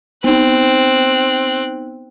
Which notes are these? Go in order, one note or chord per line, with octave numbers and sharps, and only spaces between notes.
B3 C4 D#4 F#6